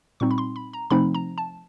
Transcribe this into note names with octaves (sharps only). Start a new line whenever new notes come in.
A#2 G3 C4 D#4 C#6
B5
C6
B5
A#5
C3 F3 A3 C4 D#4 B5
A#5
A5